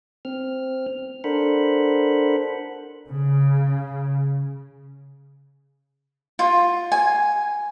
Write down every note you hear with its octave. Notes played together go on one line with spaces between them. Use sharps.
C4 F6
D4 A4 A#4 C5 F#5 B5
C#3
F4
G#5